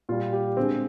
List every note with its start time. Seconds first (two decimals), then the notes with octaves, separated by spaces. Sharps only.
0.09 A#2 G3 F4
0.33 G4
0.57 D3 G#3 C4